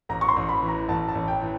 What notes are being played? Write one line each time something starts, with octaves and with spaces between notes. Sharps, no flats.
A1 A#5
C#6
C6
A1
B5
E3
A#5
A1 A5
A5
A1
G5
E3